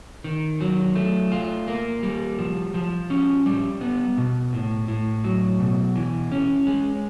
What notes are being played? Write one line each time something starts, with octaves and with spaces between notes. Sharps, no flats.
D#3
F#3
A3
F4
A#3
G3
F3
F3
C#4
G3
B3
B2
A2
A2
F#3
B2
E3
C#4
G#3